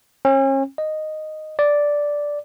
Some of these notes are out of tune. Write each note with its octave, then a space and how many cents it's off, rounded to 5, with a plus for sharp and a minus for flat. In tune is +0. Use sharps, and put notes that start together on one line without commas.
C#4 -40
D#5 -5
D5 -5